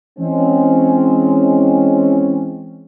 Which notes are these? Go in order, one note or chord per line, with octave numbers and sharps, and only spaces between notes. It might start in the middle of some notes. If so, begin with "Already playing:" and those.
E3 G#3 C4 C#4